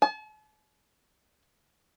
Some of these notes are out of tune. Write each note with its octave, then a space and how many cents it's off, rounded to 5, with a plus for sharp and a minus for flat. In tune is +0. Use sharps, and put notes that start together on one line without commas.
A5 -45